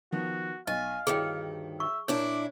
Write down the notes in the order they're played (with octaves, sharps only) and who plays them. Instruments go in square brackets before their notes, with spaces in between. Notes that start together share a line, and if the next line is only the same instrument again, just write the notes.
[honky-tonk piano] D#3 F3 B3 [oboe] F#4
[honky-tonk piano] B1 [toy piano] D#5 [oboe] F5 [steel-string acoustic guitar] G#5
[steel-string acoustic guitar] D2 G2 D#3 [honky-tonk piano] E4 C#5 [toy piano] G#4 G5
[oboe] E5 [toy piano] C#6
[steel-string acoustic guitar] A#2 D4 E4 [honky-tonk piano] A#4 A5 [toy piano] C#5 [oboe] D6